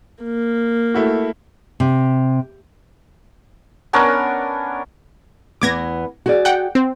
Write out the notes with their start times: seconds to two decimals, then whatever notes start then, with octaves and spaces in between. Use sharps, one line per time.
0.24 A#3
0.94 A3 E4 F#4
1.80 C3
3.93 B3 C#4 D4 A#4
5.61 E2 B3 D6 G#6 A#6
6.26 F#4 G#4 D5
6.45 F#5 G5
6.75 C4